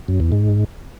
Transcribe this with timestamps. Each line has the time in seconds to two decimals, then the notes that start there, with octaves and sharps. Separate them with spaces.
0.08 F#2
0.20 E2
0.32 G#2